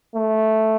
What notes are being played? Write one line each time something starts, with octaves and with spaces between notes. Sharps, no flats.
A3